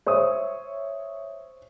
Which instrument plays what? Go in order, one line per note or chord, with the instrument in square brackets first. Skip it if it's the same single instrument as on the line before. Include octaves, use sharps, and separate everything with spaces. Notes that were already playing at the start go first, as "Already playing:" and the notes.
[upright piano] C5 C#5 E5 D#6